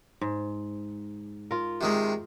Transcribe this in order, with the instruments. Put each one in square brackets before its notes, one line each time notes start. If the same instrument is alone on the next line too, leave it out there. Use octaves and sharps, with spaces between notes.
[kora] G#2
F4 A#4
[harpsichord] C3 D#3 G#3